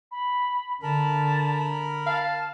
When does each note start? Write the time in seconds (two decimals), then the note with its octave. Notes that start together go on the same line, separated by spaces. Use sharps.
0.11 B5
0.83 D3 A#4 A5 B5
2.06 F5 A5